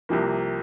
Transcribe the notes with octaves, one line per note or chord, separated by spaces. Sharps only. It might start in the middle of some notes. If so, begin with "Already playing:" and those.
C2 C3 F3 A#3